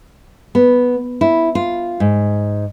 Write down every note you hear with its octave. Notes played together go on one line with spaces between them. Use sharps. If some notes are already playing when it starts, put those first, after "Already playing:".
B3
E4
F4
G#2